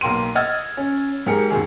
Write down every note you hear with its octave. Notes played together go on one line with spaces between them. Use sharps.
B1 A#3 G5 C6 D#7
D#5 F#5 E6 F6 G#6 A6
C#4
G#2 G4 G#4 A#4 C#7
E1 F#2 D#3 G#4